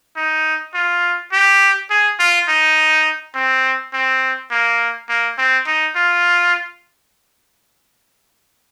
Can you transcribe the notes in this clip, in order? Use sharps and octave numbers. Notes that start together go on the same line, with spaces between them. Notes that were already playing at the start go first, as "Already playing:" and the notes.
D#4
F4
G4
G#4
F4
D#4
C4
C4
A#3
A#3
C4
D#4
F4